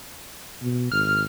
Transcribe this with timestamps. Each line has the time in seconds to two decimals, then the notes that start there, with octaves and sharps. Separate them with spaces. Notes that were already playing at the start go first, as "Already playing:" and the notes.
0.62 B2
0.92 G#1 F6